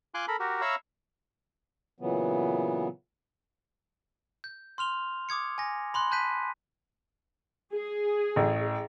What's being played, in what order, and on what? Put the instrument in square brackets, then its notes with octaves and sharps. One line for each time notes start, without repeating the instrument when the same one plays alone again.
[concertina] F4 G#5 C6 D6 F#6
A4 A#4 B5
F#4 G4 A#4
C#5 E5 F5 A#5 B5 E6
[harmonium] A#2 C#3 E3 F#3 B3
[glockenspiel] G6
C6 F6 F7 G7
D6 D#6 G#6 C#7
G#5 A#6
B5 C6 F#6
A5 F#6 G6 B6 D#7
[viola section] G#4
[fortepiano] A1